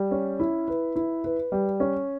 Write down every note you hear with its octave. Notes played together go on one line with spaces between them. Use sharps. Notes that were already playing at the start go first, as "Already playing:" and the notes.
Already playing: G3
C#4
E4
B4
E4
B4
G3
C#4